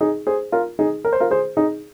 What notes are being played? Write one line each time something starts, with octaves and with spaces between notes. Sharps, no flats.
D#4 G#4
G#4 C5
F4 A#4
D#4 G#4
A#4
C5
F4 A#4
G#4 C5
D#4 G#4